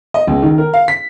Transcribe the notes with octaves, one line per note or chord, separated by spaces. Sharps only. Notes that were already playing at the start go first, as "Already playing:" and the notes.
D#5
C#2
D#3
A#4
F5
B6